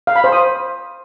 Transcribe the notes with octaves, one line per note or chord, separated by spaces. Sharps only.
F5
B5
C5
D#6